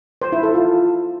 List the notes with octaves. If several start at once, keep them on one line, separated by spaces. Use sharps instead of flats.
C5
E4
A4
F4